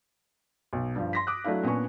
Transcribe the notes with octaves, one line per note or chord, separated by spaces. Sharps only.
B1
G2 F3
C6 A#6 B6
D6 D#6 F#6
F#3 A3 D4 E4 F5
A#2 B3 C#4 D4 G#5 C#6